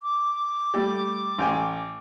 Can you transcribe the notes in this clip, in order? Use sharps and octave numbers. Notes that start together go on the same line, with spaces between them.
D6
G3 A3
A1 G5 G#5